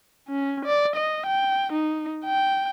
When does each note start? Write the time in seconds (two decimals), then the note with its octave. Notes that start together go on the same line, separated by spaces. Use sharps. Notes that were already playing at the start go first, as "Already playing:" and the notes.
0.29 C#4
0.65 D5
0.96 D#5
1.26 G5
1.73 D#4
2.25 G5